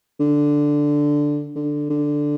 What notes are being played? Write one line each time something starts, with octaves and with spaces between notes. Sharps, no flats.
D3
D3
D3